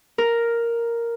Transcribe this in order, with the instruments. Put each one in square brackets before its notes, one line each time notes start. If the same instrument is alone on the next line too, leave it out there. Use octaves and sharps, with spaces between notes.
[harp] A#4